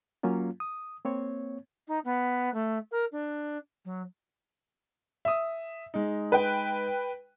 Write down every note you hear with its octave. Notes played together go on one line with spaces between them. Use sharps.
F#3 A#3 C#4 F4
D#6
A#3 C4 C#5
D#4
B3
A3
A#4
D4
F#3
E5 D#6
G#3 D#4
B4 G5